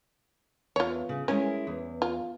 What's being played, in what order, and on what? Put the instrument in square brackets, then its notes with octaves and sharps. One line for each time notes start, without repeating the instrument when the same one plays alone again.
[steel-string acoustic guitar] E2 [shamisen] F4 C#5
[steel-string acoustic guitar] C#3
[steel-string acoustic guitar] G#3 E4 A#4 [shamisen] C#4
[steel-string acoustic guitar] E2
[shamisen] F4